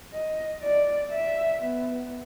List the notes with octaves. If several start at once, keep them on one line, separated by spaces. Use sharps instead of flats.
D#5
D5
E5
B3